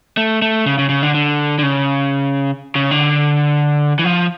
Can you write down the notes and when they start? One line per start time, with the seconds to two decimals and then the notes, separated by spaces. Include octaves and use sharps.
0.17 A3
0.42 A3
0.66 C#3
0.78 C#3
0.89 C#3
1.03 D3
1.14 D3
1.59 D3
1.63 C#3
2.75 C#3
2.91 D3
3.99 E3
4.04 F3